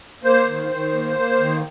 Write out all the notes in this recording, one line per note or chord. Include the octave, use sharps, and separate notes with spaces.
A#3 C5
D#3
D#3
A#3
A#3
D#3